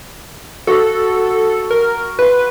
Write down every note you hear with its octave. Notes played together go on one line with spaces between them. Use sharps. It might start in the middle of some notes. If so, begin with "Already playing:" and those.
F#4 A4 F#5
A#4
B4 B5 C6